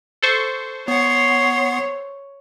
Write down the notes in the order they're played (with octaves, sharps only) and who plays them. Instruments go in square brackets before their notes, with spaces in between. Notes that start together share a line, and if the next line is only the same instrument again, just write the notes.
[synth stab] A4 C5 C#6
[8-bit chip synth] B3 F#5 [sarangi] C#5 [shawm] C6